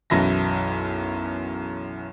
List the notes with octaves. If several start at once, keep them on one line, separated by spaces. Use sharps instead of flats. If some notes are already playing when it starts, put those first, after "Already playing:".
B1 F#2 E3 E4 A#6